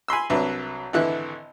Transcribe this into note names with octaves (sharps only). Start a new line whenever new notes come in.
G#5 B5 C6 E6
C2 F#3 D4 B4 E5
G#1 D3 E3 E4 F#6